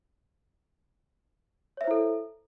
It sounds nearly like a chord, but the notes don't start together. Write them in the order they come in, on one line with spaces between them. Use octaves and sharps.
C#5 E5 C5 E4 A4